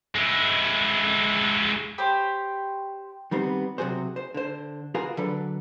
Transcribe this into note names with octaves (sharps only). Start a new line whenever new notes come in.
G#3 E4
G4 C5 C#5 B5
D#3 G3 B3 C4
C3 F#3 F#4 G#4 C5
C5
D3 C5
F4 F#4 G#4 A#4 B4 F5
D3 F#3 D4 A4 B4